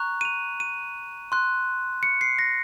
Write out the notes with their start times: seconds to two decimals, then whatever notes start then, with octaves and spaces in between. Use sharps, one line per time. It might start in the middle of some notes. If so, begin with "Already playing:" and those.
Already playing: A#5 C#6 F#6
0.21 D#7
0.25 F7
0.60 D#7
1.32 C6 F#6
2.03 C#7
2.21 C7
2.39 A#6